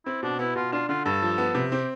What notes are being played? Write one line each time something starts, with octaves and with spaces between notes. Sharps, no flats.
C4 E4
B2 D4
B3 E4
B2 F4
D4 F4
D3 F4
G2 A4
F3
B3
C3
C4 G4